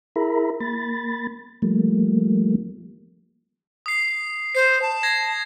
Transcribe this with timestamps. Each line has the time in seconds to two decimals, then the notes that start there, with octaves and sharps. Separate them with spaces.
0.16 E4 G#4 A#4 E5 A#5 B5
0.60 A#3 B5 A6
1.62 F3 G3 A3 A#3
3.86 D#6 C7
4.55 C5 C7
4.82 A5
5.03 G#6 A#6 C7